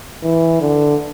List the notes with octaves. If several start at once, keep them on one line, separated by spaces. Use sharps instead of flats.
E3
D3